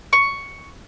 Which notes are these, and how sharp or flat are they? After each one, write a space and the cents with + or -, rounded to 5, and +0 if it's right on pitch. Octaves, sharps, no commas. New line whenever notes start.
C#6 +5